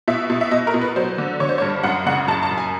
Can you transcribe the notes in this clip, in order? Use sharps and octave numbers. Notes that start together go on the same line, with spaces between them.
B2 E5
B2
E5
B2 D#5
A#4
B2
B4
F#3 C5
D3
D3 C#5
C5
C#5
G2
F#2 F#5
C#3 F#5
F#2 A5
A5
F#2
G#5